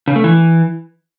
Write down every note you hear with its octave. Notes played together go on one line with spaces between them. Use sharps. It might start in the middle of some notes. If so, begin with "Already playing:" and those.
C#3
A3
E3